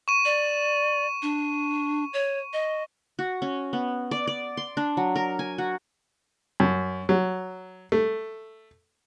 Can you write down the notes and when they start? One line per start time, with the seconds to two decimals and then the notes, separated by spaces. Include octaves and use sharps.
0.08 C#6 D#7
0.25 D5
1.22 D4
2.13 C#5
2.53 D#5
3.19 F#4
3.42 C#4
3.73 B3
4.11 D5
4.27 D5
4.57 C6
4.77 D4
4.97 F#3
5.15 A#4
5.39 G#5
5.58 F#4
6.60 F#2
7.09 F#3
7.92 A3